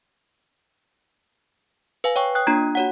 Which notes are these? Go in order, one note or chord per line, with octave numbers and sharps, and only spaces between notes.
B4 F5 G#5
C#5 G5 C#6
G5 D#6 F#6
A#3 D4 F4 G5 A#5 G#6
F#4 C#5 F#5